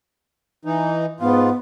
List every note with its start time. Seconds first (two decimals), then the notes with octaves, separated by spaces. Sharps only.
0.65 E3 D#4
1.20 G#2 B3 F4